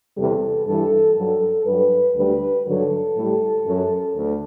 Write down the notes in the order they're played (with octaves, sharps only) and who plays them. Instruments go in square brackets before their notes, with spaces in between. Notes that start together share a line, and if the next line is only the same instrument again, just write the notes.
[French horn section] E2 C3 G3 A4
G2 E3 G3 A4
G2 F#3 A4
G2 F#3 B4
D2 D3 G3 B4
G2 D3 F#3 A4
A2 G3
F#2 F#3
D2